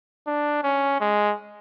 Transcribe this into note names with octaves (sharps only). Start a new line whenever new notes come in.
D4
C#4
G#3